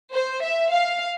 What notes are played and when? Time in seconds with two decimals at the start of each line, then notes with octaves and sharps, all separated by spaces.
0.14 C5
0.43 E5
0.72 F5